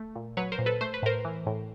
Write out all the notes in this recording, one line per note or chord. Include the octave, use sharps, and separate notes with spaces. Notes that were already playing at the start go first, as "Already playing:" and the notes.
Already playing: A3
A#2
F#3 B4 C#5
A#4 C5
A#2
A4 B4
A3 C5
B4
A2 A#4 C5
E3
A2